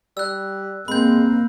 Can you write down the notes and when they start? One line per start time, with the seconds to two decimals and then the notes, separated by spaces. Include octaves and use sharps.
0.17 G3 E6 F#6
0.88 G#3 A#3 C4 B5 G6